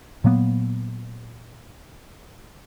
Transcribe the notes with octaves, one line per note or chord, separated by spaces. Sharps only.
A#2 F#3 A#3 B3